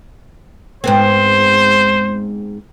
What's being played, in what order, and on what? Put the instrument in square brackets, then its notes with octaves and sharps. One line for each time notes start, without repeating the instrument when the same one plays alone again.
[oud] G#2 B3 C4 [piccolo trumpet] C5